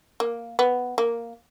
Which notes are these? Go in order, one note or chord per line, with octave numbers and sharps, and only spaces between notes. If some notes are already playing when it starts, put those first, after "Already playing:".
A#3
B3
A#3